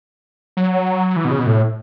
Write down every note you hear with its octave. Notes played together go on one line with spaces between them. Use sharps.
F#3
E3
B2
C#3
B2
A2